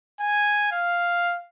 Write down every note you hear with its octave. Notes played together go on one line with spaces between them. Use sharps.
G#5
F5